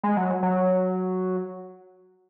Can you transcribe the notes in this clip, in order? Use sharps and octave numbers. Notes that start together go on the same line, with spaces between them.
G#3
F#3
F#3